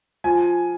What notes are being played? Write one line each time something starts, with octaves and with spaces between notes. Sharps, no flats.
F3 G#5